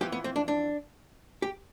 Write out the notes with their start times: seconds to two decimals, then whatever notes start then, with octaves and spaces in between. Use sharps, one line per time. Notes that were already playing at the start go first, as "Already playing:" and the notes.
0.01 F2 E3 B3 G4
0.12 B3
0.24 C4
0.36 D4
0.48 D4
1.42 G4